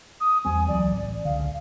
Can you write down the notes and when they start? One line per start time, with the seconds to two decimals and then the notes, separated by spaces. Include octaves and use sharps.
0.20 D#6
0.45 E2 G3 C4 G#5
0.68 C#2 E3 F#3 D5
0.91 A1
1.25 C#2 D3 F5